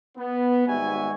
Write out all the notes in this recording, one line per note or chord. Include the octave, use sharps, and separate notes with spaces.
B3
G#1 G#2 G3 F#4 E5 G#5